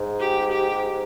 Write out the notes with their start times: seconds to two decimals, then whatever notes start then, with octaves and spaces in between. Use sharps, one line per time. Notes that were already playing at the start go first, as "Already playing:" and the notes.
Already playing: G#2
0.20 G4
0.52 G4